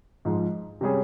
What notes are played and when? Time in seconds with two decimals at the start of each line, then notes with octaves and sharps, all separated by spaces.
0.25 G#2 F3 G#3
0.81 C3 G3 C#4 G#4